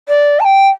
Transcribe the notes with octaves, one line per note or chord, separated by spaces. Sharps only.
D5
A5
G5